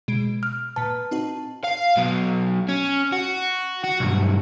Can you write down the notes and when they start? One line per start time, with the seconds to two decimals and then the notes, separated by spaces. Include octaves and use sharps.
0.08 B2 G#3 D7
0.43 F6
0.76 A#2 B4 A5
1.11 C4 D#4 F#4
1.64 F5
1.97 B1 B2
2.69 C#4
3.12 F#4
3.84 F#4
4.00 B1 G2